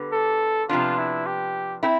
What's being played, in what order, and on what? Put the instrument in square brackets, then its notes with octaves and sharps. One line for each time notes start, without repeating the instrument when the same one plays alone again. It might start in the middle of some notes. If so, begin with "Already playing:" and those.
Already playing: [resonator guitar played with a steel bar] D3 G3 B3
[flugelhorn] A4
[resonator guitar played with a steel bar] C3 F3 B3 D4 [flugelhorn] F4
[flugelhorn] E4
G4
[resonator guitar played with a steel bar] C4 E4